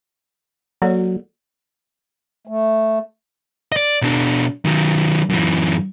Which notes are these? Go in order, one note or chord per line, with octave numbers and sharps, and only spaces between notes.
F#3 A#3 A4 D5
A3
D5 D#5
B2 D4
D#3 F#3
F#2 E3